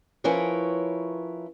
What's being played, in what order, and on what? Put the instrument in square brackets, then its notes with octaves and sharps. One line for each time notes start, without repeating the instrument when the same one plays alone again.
[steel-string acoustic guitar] F3 C#4 E4 A#4 B4 C#5